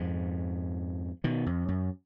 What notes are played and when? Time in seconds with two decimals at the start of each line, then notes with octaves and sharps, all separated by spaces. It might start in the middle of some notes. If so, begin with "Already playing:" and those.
Already playing: F2 G#2
1.24 B2 D#3
1.46 F2
1.68 F#2